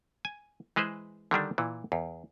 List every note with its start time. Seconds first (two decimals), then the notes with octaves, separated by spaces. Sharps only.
0.25 G#5
0.76 E3 G#3 G#4 B4 C5
1.31 D3 D#3 G3 D4
1.58 A#2 E3
1.92 E2